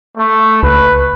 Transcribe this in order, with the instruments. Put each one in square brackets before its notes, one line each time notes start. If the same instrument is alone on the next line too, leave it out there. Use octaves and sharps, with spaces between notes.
[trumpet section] A3
[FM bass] C#2 [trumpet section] B4